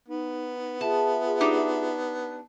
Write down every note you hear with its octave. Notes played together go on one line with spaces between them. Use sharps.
B3 D#4
F4 G#4 E5 A5
D4 D#4 G4